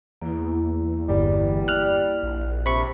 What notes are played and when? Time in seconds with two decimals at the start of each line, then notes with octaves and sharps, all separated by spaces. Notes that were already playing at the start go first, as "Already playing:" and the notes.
0.22 E2 A#3 E4
1.09 G1 G3
1.68 F6 F#6
2.23 A#1
2.66 C3 B5 C#6